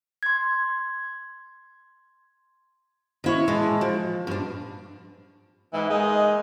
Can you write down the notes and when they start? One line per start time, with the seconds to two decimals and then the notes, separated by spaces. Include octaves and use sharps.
0.23 C6 G#6
3.24 D#3 E4 C#5
3.48 E3 G#3 A5
3.81 F3
4.27 G2 D4
5.73 G#2 E3
5.90 G#3 A#3 D#4